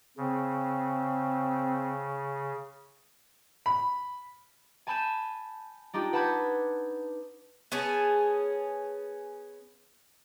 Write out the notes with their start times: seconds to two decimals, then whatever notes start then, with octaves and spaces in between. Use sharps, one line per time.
0.17 C#3 C4
3.66 B5
4.87 G#5 A5 B5 G6 D#7 E7
5.93 D4 D#4 F4 G4
6.13 B4 F#5 A5 B5 G6 G#6
7.72 B3 C#4 G#4 A5